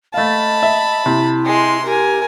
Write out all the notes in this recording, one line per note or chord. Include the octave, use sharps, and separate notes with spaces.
A3 D#5 F5 A5 B5
E5
C3 E4
G#3 C6
G4 A#4 G#5